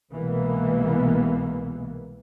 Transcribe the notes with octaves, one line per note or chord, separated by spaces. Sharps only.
C2 B2 E3 G#3 A#3 B3